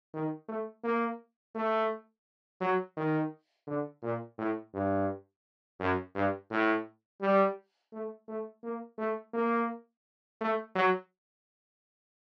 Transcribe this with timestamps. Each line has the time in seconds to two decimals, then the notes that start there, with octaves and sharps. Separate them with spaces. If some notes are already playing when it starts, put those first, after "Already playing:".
0.14 D#3
0.49 A3
0.84 A#3
1.55 A3
2.61 F#3
2.97 D#3
3.67 D3
4.02 A#2
4.38 A2
4.74 G2
5.80 F#2
6.15 G2
6.51 A2
7.21 G3
7.93 A3
8.28 A3
8.63 A#3
8.98 A3
9.34 A#3
10.41 A3
10.75 F#3